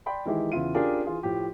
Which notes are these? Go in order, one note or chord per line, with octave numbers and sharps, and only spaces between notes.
D5 G5 B5 C6
D#3 E3 G#3 E4 G4
E2 C#3 E4 F4 D#7
C#4 D4 F4 G4 G#4 A#4
E3 F4 G#4
A2 F3 G4